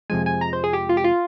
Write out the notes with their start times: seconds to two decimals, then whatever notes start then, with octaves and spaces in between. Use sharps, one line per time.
0.10 F2 C3 F3 G#3 G#5
0.26 G#5
0.41 A#5
0.53 C5
0.64 G#4
0.73 G4
0.89 F4
0.97 G4
1.04 F4